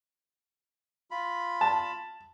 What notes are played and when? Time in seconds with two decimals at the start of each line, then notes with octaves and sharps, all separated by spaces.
1.11 F4 B5
1.61 A5